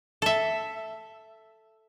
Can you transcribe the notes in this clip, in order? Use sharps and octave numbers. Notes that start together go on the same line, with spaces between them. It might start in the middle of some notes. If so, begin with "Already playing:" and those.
A4 E5